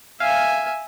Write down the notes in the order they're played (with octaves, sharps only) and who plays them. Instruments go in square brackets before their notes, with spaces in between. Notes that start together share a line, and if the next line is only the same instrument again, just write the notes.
[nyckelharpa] E5 G#5 [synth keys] F5